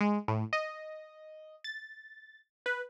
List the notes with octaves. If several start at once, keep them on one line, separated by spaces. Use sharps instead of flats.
G#3
A2
D#5
A6
B4